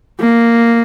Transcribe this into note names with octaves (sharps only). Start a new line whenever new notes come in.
A#3